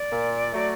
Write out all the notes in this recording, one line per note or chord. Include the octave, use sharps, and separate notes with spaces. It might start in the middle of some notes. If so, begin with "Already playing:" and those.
Already playing: D5
A#2
F#3 A3